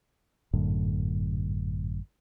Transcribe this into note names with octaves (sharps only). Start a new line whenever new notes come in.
G#1 F#2 A2 D3